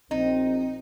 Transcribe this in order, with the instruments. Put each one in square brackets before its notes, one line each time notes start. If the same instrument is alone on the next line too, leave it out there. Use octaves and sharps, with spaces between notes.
[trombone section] A#1 C4 [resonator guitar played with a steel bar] D#4